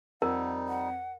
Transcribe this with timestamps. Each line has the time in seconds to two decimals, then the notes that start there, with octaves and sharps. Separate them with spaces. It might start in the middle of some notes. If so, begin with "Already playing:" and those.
0.22 F2 G3 D#4 A#4 F#5
0.68 F#5